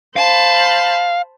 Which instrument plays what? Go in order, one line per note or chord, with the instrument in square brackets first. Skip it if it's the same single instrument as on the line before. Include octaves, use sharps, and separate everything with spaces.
[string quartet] C5 A5 B5 [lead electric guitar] F5